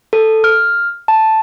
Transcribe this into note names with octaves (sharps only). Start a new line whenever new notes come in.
A4
F6
A5